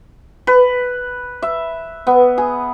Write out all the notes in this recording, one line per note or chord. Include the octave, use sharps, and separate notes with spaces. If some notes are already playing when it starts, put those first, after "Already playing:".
B4
E5
B3
G#4